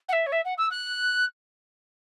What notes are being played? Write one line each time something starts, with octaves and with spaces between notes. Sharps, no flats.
F#5
E5
C#5
E5
F#5
E6
F#6